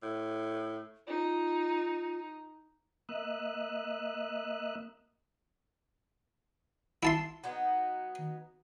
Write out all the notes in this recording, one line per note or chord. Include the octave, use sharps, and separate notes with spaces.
A2
D#4 F4
A#3 D#5 E5 F#6
E4 A5 C6
F#3 B3 D#4